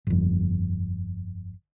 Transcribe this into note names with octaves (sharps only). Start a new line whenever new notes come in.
G1 F2